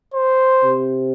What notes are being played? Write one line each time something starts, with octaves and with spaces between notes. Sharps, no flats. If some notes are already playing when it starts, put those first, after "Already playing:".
C5
C3